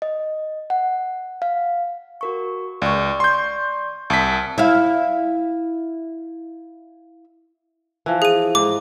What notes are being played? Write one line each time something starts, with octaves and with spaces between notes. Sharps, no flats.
D#5
F#5
F5
F#4 A#4 C#6
C#2 D5 C#6
C6 G6
C2 A5 D#6 F6 B6
E4 F5
E3 F3
G#4 D#7
G#2 D6